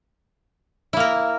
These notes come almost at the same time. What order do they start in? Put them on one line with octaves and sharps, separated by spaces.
E4 A#3 A#4